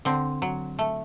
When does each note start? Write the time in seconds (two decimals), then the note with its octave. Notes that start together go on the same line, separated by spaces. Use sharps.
0.05 D3 C4
0.42 F#3
0.79 A3